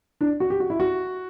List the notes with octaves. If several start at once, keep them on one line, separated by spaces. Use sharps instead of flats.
D4
F#4
G4
F#4
E4
F#4